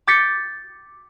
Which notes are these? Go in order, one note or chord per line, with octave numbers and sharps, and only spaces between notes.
D6 G6 A6 B6 C#7